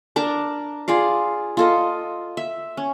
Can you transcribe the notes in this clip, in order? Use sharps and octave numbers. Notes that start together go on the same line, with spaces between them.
D4 A#4 A5 A#5
F4 G#4 D5 F5
F4 A4 D#5
E5
C#4